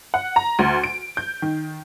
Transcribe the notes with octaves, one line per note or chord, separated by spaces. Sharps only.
F#5
A#5
D2
D7
G6
D#3